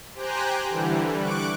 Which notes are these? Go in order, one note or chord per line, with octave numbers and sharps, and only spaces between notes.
G4 C5 G5 G#5 A#5 F#6
D3 E3 G3
C#6 D6 F#6 D7